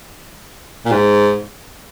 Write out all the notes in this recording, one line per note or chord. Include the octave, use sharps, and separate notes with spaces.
A#2
G#2